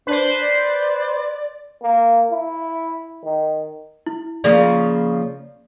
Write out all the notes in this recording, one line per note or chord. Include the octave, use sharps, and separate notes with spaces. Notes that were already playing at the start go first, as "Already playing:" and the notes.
D4 B4 C5
D5
A#3
E4
D#3
E4
C#3 F3 A#3 D5